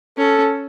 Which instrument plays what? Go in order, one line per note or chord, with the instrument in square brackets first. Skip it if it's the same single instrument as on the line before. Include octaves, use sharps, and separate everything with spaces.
[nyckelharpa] C#4 [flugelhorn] A4